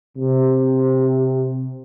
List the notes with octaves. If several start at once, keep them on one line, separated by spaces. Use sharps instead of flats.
C3